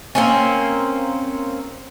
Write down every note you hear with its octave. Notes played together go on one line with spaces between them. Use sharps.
A#3 C4 C#4